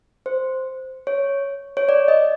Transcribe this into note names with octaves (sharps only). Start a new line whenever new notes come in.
C5
C#5
C#5
D5
D#5